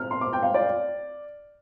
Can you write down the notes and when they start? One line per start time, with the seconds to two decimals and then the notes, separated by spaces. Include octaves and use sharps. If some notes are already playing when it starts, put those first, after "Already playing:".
Already playing: F6
0.11 C6
0.21 D6
0.33 G5
0.43 F5
0.54 D5